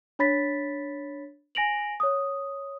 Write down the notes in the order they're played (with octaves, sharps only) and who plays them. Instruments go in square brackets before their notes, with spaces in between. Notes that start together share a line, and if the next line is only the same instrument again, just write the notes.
[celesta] D4 C#5 B5 A6 B6
G#5 A#6 D7 F7 F#7
C#5 D#6